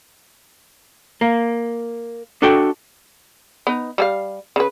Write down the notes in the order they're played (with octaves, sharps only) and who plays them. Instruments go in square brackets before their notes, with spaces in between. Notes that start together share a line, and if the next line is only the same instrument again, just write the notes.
[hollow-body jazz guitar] A#3
D4 F#4 A4 E5 G5
[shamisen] B3 D#4
G3 A4 F5
C#3 B4